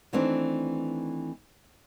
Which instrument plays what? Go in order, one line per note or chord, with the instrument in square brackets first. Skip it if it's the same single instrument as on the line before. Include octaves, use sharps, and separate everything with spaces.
[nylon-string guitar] D#3 E3 A3 C4 D4